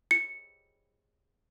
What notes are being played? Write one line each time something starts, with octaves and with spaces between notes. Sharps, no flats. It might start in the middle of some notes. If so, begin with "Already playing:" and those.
C#7